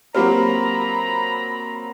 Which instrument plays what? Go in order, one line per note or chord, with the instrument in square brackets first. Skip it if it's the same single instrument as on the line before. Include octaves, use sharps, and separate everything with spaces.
[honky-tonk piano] F#3 A#3 C4 [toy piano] F4 G4 B4 [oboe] A#5 [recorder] B5